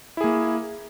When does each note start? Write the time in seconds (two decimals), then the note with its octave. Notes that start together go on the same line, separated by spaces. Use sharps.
0.17 E4
0.21 G#4
0.24 A#3